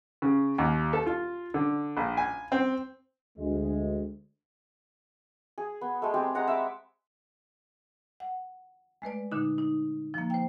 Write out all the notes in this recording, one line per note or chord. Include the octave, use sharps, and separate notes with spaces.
C#3
D#2
A4
F4
D3
A#1
G#5
C4
D2 G#3
G#4
B3
G#3 A3
C4 G4 G#4
G#3 F#5 A#5
E5 B5 D6
F#5
G#3 A3 B4 D5
A#2 D3 D#4
D#4
F3 A#3
C5 G5